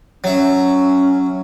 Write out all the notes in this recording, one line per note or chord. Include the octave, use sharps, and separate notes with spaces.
F#3 C#4 E5